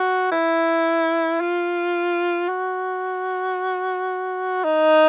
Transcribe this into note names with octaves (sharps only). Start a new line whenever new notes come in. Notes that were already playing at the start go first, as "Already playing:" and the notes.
Already playing: F#4
E4
F4
F#4
D#4